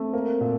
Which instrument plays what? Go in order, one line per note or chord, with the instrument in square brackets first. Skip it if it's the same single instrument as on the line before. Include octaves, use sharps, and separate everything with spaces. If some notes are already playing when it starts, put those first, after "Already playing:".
Already playing: [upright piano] A3 [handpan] C4
[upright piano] A#3
A#2